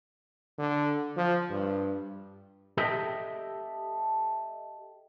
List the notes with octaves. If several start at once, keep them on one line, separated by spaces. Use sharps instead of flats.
D3
F3
G2
G4 A4 D#5 E5 G5